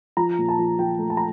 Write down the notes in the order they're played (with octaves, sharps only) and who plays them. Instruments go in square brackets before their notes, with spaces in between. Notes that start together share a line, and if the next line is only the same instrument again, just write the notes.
[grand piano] F3 A#5
A#2
A5
F3
F3 G5
A3
A5
A#5